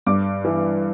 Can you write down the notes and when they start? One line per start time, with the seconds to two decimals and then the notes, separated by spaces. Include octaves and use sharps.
0.07 G2 D6
0.45 E3